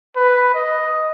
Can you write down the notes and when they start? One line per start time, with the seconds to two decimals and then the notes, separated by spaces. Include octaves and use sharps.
0.16 B4
0.55 D#5